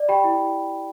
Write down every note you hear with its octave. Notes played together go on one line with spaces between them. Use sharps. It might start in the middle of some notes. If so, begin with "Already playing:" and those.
Already playing: D5
G4 G5 B5
E4